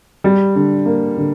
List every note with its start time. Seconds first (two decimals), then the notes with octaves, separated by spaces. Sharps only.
0.24 G3
0.56 D3
0.86 A#3
1.17 D3